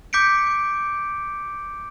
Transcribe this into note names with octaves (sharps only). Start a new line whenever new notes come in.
D6 G6 B6 C#7 D7